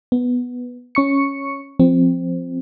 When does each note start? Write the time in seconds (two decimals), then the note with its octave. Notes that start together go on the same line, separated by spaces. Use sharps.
0.12 B3
0.95 C#4 C#6 C#7
1.79 F3 C4